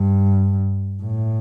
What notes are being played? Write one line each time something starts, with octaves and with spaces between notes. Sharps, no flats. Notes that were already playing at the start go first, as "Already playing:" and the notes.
Already playing: G2
A2